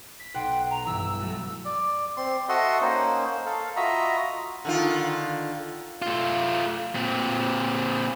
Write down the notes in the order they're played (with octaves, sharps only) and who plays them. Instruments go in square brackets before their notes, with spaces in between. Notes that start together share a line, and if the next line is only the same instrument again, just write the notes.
[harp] B6
[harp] B1 F#5 C6 [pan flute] G5
[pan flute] A#5
[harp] G2 E3 [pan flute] E6
[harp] E3
F#3 A3 F#4
[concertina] D5
C4 C6
F#4 A4 D#5 E5 F#5 C6
A#3 C#4 D#4 C5
A4 F5
F4 F#4 D#5 E5 A#5 B5
[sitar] D3 D#3 F4
[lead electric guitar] A3 F4
A#2 C4